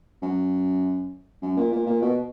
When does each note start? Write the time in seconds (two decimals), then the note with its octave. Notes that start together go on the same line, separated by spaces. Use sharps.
0.22 F#2
1.42 F#2
1.57 A#2
1.72 A#2
1.86 A#2
2.02 B2